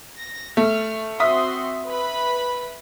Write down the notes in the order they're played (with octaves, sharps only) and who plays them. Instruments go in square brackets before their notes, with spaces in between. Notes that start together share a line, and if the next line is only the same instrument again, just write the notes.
[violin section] A#6
[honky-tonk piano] A3 [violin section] F6
[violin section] C4 F#4 C6 [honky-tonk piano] E5 D#6
[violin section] B4 B5